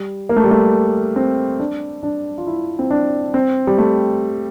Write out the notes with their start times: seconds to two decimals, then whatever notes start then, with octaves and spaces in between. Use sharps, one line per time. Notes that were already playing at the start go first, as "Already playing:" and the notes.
Already playing: G3
0.29 A#3
0.36 A3
0.44 G3
0.51 A3
1.16 C4
1.60 D4
2.03 D4
2.38 F4
2.47 E4
2.79 C4
2.91 D4
3.34 C4
3.67 G3
3.78 A3